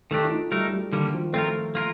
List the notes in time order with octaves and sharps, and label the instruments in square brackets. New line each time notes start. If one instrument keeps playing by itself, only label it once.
[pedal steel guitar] D#3 A3 D4 G4 [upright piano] A4
[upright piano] F4
D#4
[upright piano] G3 [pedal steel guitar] A3 D#4 A#4
[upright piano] G3
[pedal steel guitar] D3 G3 A#3 [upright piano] D#3
[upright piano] F3
[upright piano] A3 [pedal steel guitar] C4 F4 A#4
[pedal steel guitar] A#3 F4 A#4